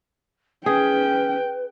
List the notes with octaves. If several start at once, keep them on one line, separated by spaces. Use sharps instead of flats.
C#4 G#4 B4 G5